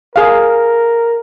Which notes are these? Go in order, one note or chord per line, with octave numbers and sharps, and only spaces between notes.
G#4 A#4 F5